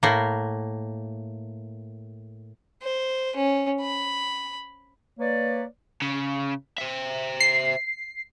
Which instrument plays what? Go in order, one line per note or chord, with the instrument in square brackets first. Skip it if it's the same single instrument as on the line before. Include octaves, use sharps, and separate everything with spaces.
[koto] A2 A#3
[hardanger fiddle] C5
C#4
B5
[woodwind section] A#3 B4 C#5 D5
[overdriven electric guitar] C#3
C5 E5
[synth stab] C7